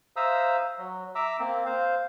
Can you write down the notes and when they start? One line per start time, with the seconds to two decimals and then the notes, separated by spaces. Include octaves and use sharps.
0.16 C5 E5 F5 A#5 D#6 E6
0.78 F#3
1.15 E5 A#5 D6 E6
1.39 A#3 C4
1.66 C5 F5